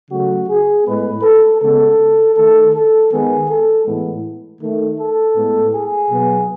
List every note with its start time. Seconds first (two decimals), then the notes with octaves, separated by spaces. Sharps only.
0.10 C#3 F#3 A3 F#4
0.49 G#4
0.85 A2 G#3 B3 B4
1.23 A4
1.61 C#3 G#3 B3 A4
2.36 D#3 A3 A4
2.73 A4
3.11 D#3 G#3 B3 G#4
3.49 A4
3.86 A2 E3 G#3 B3
4.62 D#3 A3
4.98 A4
5.36 A2 G#3 B3
5.74 G#4
6.11 B2 F#3 B3